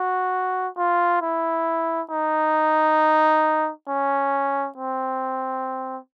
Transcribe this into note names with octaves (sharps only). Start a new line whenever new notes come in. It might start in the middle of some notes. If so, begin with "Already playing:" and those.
Already playing: F#4
F4
E4
D#4
C#4
C4